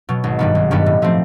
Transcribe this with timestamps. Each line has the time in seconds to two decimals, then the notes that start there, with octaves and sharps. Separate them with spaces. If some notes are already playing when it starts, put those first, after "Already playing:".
0.09 B2 F#3
0.24 G#1
0.39 G2 D#3 G3 B3
0.55 G#1
0.71 G2 D#3 G3 B3
0.86 A2
1.02 F3 A3 C4